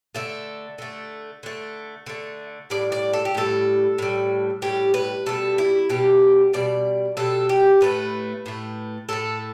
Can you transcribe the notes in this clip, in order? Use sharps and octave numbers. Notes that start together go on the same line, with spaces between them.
D3 A3 E5
D3 A3
D3 A3
D3 A3
A2 G3 D5
D5
A4
G4
A2 G3 A4
A2 G3
A2 G3 G4
B4
B2 G3 A4
E4
B2 G3 G4
B2 G3 D5
B2 G3 A4
G4
A2 A3 B4
A2 A3
A2 A3 A4